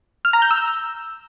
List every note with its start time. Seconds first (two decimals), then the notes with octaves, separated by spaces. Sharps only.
0.25 F6
0.33 A#5
0.42 G6
0.51 E6